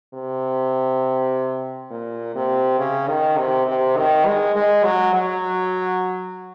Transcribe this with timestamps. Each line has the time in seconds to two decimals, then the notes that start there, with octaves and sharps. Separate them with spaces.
0.14 C3
1.90 A#2
2.35 C3
2.79 C#3
3.08 D#3
3.38 C3
3.67 C3
3.96 D#3
4.26 G#3
4.55 G#3
4.84 F#3
5.14 F#3